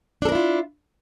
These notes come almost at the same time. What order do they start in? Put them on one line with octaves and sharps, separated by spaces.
D4 A4 A#4 E4 F4